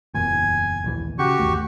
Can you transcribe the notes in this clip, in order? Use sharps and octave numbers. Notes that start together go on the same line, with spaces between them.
F#1 E2 A#2 G#5
D#1 A#1 E3
C#3 F#4 G4 C#6
G1 D#2 A3